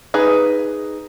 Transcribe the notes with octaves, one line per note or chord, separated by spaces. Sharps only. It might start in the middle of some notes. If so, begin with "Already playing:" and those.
D#4 G#4 B4